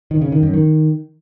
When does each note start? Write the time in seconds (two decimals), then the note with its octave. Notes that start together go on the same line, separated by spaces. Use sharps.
0.11 D#3
0.22 C#3
0.32 D#3
0.43 F#2
0.53 D#3